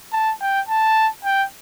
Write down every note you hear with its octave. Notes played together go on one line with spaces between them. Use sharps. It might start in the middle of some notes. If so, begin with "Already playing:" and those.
A5
G5
A5
G5